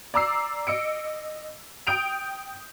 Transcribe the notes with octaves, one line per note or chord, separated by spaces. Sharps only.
D5 A#5 D6 E6 C7
D#5 E6 C#7 D7
G5 D#6 G6 D7 F7